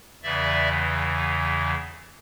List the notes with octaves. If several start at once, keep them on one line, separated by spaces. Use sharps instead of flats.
E2 C#3 E3 D5 E5